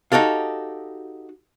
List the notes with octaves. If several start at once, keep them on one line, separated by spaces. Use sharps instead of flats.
D#4 F#4 G4 A4 F5